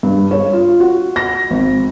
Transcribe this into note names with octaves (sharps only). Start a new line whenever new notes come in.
G2
C#5
F4
F#4
A#6
G#1